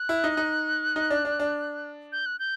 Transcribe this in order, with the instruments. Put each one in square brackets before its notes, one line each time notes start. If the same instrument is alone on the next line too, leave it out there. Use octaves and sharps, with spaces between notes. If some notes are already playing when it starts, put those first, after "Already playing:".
Already playing: [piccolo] F#6
[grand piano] E4
D#4
D#4
D#4
D4
D4
D4
[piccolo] G6
F#6
G6